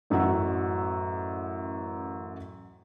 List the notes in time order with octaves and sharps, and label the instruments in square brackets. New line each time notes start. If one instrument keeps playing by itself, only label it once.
[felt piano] A1 F#2 F#4 F#5 E6